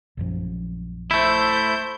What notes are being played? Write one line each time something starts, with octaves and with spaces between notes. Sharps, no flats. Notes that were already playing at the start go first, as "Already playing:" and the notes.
A#1 F#2 F3
A3 E4 C5 G6